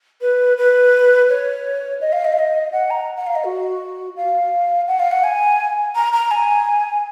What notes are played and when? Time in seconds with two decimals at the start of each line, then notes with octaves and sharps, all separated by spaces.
0.21 B4
0.57 B4
1.29 C#5
2.01 D#5
2.12 F5
2.24 D#5
2.32 F5
2.38 D#5
2.72 F#5
2.90 A#5
3.17 F#5
3.26 F5
3.35 D#5
3.44 F#4
4.16 F5
4.87 F#5
4.99 F5
5.11 F#5
5.23 G#5
5.95 A#5
6.13 A#5
6.31 G#5